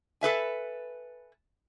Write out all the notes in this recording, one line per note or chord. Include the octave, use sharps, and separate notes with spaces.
A4 B4 E5 G#5